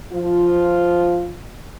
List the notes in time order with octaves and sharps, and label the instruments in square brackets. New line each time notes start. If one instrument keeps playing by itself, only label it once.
[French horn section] F3 F4